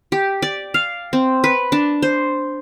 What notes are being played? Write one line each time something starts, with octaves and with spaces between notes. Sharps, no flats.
G4
D5
F5
C4
B4
D4
C5